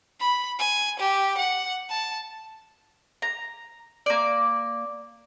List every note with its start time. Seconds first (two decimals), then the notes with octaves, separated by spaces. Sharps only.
0.20 B5
0.59 G#5
0.99 G4
1.37 F#5
1.90 A5
3.22 A#5
4.06 A#3 D5